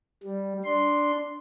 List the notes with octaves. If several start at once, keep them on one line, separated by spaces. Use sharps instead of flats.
G3
D4 C6